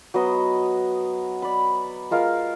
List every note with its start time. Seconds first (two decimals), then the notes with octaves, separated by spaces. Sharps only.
0.14 F#3 B3 D#5
1.42 D5 B5
2.11 G#3 F4 A#4 F5